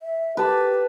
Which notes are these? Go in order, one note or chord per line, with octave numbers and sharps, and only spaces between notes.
E5
G4 B4 A5 B5